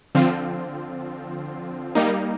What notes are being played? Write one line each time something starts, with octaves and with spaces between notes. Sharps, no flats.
D3 F3 C4 F4
G3 A#3 D#4